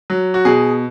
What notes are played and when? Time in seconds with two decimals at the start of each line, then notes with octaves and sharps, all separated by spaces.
0.10 F#3
0.34 F#4
0.45 B2 G#4